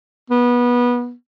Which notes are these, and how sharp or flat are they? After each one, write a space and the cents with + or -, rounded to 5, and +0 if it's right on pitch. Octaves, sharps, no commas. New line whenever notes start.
B3 -20